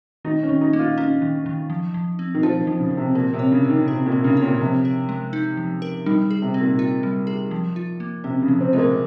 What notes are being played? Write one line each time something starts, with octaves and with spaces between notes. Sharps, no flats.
D#3 D#4
C#4
D#3
D#4
A#3
F4
C#4 D#4
D#3
D#3
F3
F3
C4
D#3
F3 F4
D#3
F3
C#3
F3
C3
A#2 C4
C3
C#5
C#3
F4
D#3
C3 A#4
A#2
C4
C#3
C#5
A#2
C3 F3
A#4
G#3
D#4
F3
A#4
D#3 G3
G#4
C3
C4
A#2
F4
G3
G#4
F3
F4
A#3
C3 C#4
C#3
F3
C4
G#3 F4
A#3